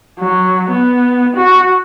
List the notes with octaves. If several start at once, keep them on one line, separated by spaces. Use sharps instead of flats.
F#3
B3
F#4